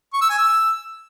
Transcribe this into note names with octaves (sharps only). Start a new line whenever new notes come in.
C#6
E6
G#5
E6